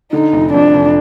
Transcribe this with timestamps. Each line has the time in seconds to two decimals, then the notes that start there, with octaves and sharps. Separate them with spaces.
0.12 D3 D#4
0.33 F1
0.53 F2 D4
0.74 F1